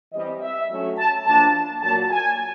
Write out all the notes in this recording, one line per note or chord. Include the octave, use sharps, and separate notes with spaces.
E3 G3 C4 D#5
E5
F#3 A3 C#4
A5
F3 A#3 D4 A5
A#2 F#3 A#3 A5
G#5